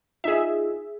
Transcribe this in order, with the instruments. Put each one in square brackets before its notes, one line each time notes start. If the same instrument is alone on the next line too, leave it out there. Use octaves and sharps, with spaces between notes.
[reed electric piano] D#4 F4 [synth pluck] G#4 E5